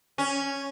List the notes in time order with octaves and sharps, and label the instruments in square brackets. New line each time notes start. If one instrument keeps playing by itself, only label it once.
[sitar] C#4